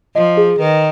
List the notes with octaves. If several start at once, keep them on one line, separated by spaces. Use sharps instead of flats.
F3 D#5
G#4
D#3 B4